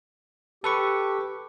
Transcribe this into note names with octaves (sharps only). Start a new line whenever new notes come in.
G4 A4 B4 C#6